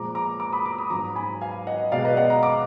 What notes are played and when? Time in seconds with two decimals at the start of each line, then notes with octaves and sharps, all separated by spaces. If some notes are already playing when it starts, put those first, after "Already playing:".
Already playing: A#2 F3 G#3 A#5 D6
0.15 A#5 D6
0.40 A#5 D6
0.52 B5 D#6
0.66 A#5 D6
0.78 B5 D#6
0.90 G#2 F#3 A#5 D6
1.16 G#5 B5
1.41 F5 G#5
1.67 D#5 F#5
1.92 B2 G#3 D5 F5
2.05 B4 D#5
2.17 D#5 F#5
2.30 F#5 A#5
2.43 A#5 D6